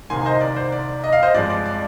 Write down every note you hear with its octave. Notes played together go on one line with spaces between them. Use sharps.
C2 C3 D#3 A#3 G#5 C6
C5 D#5
D5
C5
D5
D#5
F5
C5 D#5
G2 F3 G#3 C4 D5
D5
D5